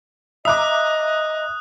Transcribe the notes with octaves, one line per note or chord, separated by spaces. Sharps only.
D#5 E5 A#5 D6 D#6 F#6